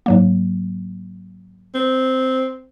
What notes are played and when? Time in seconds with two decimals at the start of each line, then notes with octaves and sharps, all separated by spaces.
0.06 G#2 F#3 A#3
1.75 C4